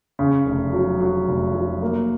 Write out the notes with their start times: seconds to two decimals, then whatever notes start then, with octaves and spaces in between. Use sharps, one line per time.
0.19 C#3
0.46 F1
0.73 F#3
1.00 F#3
1.28 F1
1.55 F#3
1.82 A#3